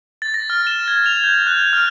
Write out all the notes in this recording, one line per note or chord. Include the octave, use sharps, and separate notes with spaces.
A6
A#6
F6
E7
G#6
F7
G6
F#6
F6